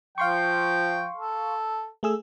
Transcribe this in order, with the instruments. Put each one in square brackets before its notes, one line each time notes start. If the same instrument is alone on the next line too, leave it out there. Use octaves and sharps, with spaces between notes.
[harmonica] F3 G5 [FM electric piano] F5 C6 C#6
[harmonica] A4
[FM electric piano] A3 G#4 E6